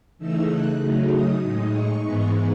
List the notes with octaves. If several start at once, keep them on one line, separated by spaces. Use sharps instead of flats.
C#3 E3 A3 D#4 E6
F#6
C#3 F#3 A3 D#4
D#6
A2 G#3 D#4
C#6
G#2 E3 G#3 B3 D#4